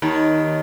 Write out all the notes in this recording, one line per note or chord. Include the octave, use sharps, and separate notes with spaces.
D#2 D#3